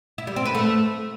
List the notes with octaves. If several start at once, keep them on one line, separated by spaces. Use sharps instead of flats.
E4
G3
C4
B4
A3